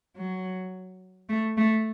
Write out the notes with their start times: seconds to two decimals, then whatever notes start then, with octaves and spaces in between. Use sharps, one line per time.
0.16 F#3
1.29 A3
1.57 A3